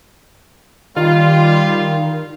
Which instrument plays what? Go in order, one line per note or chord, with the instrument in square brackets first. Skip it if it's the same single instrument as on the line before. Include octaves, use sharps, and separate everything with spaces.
[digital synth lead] D#3 [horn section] G3 F4